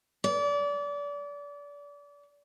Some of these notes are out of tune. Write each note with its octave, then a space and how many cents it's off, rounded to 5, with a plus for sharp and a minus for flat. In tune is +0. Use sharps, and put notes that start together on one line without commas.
D5 -30